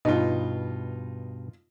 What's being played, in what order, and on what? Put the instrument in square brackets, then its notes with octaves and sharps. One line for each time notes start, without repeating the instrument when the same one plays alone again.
[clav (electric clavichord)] G2 B2 [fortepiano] D#4 F4